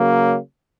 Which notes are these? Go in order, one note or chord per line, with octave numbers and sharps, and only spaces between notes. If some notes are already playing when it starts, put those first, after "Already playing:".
Already playing: C#3 F#3 A#3